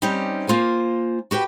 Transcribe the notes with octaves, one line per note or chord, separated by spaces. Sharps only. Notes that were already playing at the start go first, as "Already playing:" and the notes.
G3 C4 C#4 D#4 G4
A#3 F4 C5 G#5
F#4 G4 B4 G5